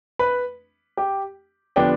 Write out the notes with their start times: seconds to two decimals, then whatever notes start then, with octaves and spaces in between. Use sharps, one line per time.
0.19 B4 B5
0.97 G4 G5
1.76 D3 F3 B3 D4 G4 G5